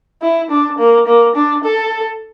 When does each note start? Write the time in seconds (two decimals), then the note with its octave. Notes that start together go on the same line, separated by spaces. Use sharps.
0.22 E4
0.50 D4
0.78 A#3
1.06 A#3
1.35 D4
1.63 A4